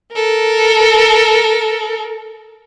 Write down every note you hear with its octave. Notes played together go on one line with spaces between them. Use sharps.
A4 A#4